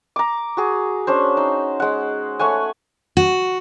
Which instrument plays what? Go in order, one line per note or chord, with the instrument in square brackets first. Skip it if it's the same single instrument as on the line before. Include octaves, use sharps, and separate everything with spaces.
[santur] A#5 D6
F#4 G#4
C#4 D4 C5
D#4
G#3 F#5
A3 C#5 F#5 G#5
[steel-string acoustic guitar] F#4